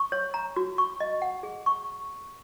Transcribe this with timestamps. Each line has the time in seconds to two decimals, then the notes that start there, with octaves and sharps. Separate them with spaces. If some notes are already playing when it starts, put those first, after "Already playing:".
Already playing: C#6
0.12 C#5
0.34 A#5
0.56 F#4
0.78 C#6
1.00 D#5
1.22 F#5
1.43 G#4
1.66 C#6